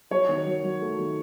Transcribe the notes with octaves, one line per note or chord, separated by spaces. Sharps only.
F#3 C#5
D#3
F#3
F#3
A3
D#3